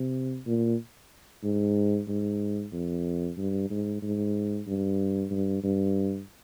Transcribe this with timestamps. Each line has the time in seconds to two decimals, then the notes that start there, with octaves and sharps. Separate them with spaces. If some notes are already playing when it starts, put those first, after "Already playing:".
Already playing: C3
0.46 A#2
1.43 G#2
2.08 G#2
2.73 F2
3.38 G2
3.70 G#2
4.02 G#2
4.67 G2
5.30 G2
5.63 G2